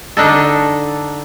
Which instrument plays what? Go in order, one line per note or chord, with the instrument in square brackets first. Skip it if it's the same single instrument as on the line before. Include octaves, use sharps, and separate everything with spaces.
[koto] D3 D4 D#4 A4